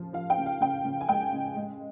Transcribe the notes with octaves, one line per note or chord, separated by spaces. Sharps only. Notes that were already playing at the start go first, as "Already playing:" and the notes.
Already playing: C#3 F3
F3 F5
G5
C#3
F5
C#3 G5
C#3
G#5
G#3 G5
C#3
G#3